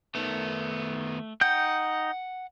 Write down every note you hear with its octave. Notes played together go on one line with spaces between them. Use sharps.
D#3 A3 B3
D#4 F#5 G5 G6